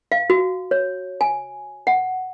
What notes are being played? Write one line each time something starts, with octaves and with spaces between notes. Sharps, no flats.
F5
F#4
C#5
G#5
F#5